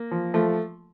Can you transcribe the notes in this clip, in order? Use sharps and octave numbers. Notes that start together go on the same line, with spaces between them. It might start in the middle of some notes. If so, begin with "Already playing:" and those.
Already playing: A#3
F3
F3 A3